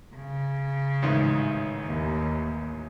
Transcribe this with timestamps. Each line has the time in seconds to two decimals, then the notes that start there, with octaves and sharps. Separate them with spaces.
0.15 C#3
1.02 A1 G#2 D#3
1.85 D#2